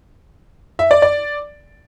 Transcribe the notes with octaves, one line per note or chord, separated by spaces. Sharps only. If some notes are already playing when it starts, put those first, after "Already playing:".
E5
D5
D5